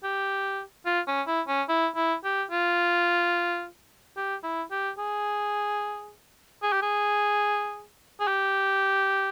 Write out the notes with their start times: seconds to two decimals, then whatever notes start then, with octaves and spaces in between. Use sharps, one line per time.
0.04 G4
0.86 F4
1.08 C#4
1.27 E4
1.48 C#4
1.69 E4
1.96 E4
2.24 G4
2.51 F4
4.17 G4
4.43 E4
4.71 G4
4.98 G#4
6.63 G#4
6.73 G4
6.82 G#4
8.20 G#4
8.27 G4